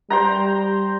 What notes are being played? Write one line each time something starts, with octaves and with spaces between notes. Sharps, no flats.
G3 C5 G5 A#5